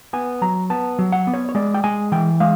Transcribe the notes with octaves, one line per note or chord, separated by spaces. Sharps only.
B3 G#5
F#3 A#5
B3 A5
F#3
F#5
B3
C#5
C#5
G#3 D5
G5
G#3 G#5
E3 G5
G#3 F5